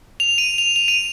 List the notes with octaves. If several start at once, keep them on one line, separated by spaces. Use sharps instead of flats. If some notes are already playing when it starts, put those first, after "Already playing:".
F7
D#7
F7
F7
D#7